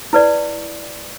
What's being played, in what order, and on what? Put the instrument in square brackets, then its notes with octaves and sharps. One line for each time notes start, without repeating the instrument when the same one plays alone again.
[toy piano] E4 B4 D5